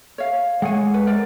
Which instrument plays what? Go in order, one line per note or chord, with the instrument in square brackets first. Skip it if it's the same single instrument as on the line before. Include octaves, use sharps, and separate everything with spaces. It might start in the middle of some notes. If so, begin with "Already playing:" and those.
[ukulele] C#5 F5
[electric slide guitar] G#3 C#5 [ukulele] F#5 G#5
[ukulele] B4
A#4 C5 D5